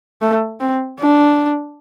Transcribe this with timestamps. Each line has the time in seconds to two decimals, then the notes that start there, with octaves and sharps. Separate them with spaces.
0.22 A3
0.60 C4
1.00 D4